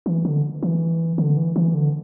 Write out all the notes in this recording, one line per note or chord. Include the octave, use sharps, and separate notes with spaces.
E3
D3
E3
D3
E3
E3
D3